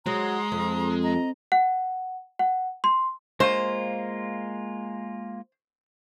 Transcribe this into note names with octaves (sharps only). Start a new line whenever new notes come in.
F#3 G#3 A#5 C6 D#6
F2
D#5 A#5
F#5
F#5
C6
G#3 A#3 F4 C5